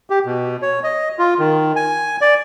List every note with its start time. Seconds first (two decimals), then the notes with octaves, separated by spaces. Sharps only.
0.10 G4
0.25 B2
0.62 C#5
0.84 D#5
1.19 F4
1.39 D#3
1.76 G#5
2.21 D5